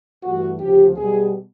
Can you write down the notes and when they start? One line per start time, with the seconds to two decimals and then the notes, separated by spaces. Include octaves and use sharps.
0.23 G2 E3 A3 F#4
0.60 D2 C#3 F3 G4
0.96 B2 G3 B3 G#4